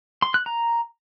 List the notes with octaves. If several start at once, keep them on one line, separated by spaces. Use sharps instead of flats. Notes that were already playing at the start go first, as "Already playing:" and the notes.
C6
F#6
A#5